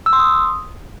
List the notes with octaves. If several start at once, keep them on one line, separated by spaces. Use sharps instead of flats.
E6
C6
D#6